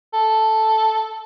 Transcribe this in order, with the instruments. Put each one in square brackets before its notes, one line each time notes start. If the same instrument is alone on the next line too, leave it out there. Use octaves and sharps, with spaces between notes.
[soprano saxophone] A4